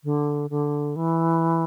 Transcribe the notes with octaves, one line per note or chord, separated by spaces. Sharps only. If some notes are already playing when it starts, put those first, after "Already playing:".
D3
D3
E3